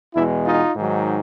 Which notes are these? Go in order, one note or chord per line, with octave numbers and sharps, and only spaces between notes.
E2 B2 G#3 D4 E4
D#4 F4
G#2 D#3 F#3